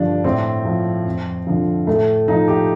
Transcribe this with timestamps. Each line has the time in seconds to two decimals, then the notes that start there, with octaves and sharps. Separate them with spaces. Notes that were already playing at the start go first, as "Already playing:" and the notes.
Already playing: G2 D3 F3 D4
0.24 A2 C4
0.65 F3
1.06 F2
1.47 D3 F3
1.87 A2 A3
2.28 F3 D#4
2.48 G4